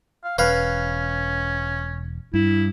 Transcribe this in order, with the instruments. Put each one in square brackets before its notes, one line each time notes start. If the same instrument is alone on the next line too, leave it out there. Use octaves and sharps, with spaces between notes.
[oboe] F5
[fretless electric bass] E1 [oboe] C#4 [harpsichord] B4 F5
[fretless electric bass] G2 [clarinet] E4